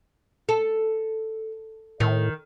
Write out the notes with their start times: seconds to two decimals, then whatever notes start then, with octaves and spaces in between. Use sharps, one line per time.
0.49 A4
2.00 A2 D#3